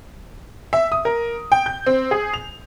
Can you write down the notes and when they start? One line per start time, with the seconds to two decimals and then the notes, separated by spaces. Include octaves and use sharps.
0.73 E5
0.92 D#6
1.05 A#4
1.52 G5
1.66 G6
1.86 C4
2.11 G#4
2.34 F7